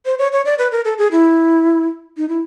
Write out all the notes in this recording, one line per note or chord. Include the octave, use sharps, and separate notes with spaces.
C5
C#5
C#5
D5
B4
A#4
A4
G#4
E4
D#4
E4